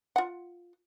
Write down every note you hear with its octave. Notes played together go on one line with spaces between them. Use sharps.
F4 F#5